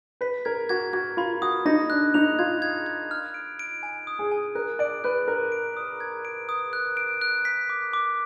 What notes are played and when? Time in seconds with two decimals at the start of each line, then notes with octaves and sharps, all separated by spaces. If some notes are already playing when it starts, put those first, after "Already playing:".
0.21 B4 B6
0.45 A#4 G#6
0.69 F#4 G#6
0.93 F#4 G#6
1.17 F4 B5
1.42 F#4 D#6
1.65 D#4 A#6
1.90 D4 F#6
2.14 D#4 F7
2.39 F4 G#6
2.62 G#6
2.86 G#6
3.11 F6
3.34 D7
3.59 D7
3.83 G#5
4.07 D#6
4.19 G#4
4.32 G#5
4.55 A#4 F#6
4.79 D5 D7
5.04 B4 F#6
5.28 A#4 F#6
5.52 D7
5.77 D#6
6.00 G#6
6.25 D7
6.49 D#6
6.73 F#6
6.97 D7
7.22 F#6
7.45 B6
7.70 D6
7.93 D6